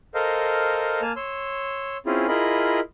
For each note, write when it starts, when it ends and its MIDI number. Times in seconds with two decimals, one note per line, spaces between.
0.15 1.01 69
0.15 1.01 70
0.15 1.01 72
0.15 1.01 75
0.15 1.01 77
1.02 1.12 58
1.02 1.12 80
1.02 1.12 81
1.02 1.12 89
1.16 1.97 73
1.16 1.97 84
1.16 1.97 88
2.06 2.27 60
2.06 2.27 61
2.06 2.27 64
2.06 2.27 65
2.06 2.27 68
2.28 2.80 64
2.28 2.80 65
2.28 2.80 68
2.28 2.80 70
2.28 2.80 75
2.28 2.80 83